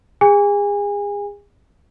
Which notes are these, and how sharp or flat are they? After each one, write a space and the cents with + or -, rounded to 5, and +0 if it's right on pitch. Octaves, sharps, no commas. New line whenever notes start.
G#4 -35 G#5 -30